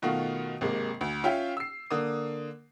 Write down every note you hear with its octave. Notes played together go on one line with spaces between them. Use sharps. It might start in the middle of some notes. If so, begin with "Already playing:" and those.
B2 D#3 A3 F4 F#4
G#1 C3 G#3 A#3
D2
C#4 F4 E5 F5 G5
E6 C7
D3 A#3 D#6